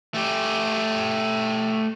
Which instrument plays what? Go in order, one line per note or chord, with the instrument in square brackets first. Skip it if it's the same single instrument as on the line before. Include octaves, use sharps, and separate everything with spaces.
[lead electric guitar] A3 G4